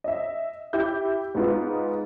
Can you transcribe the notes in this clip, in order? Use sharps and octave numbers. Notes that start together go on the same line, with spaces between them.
D#5 E5
E4 G4 G6
G#2 G#3 B3 D#4 F4